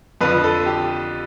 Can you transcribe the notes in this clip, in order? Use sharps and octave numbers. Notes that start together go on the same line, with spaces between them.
F2 D3 F3 B4
A4
G4